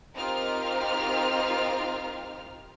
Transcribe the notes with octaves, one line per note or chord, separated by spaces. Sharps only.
C4 D#4 F4 G4 A#4 F6